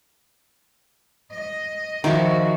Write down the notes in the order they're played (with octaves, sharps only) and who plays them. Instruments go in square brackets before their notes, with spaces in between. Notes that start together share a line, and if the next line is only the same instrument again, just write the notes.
[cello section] D#5
[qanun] D#3 E4 A#4 [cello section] F3 F#4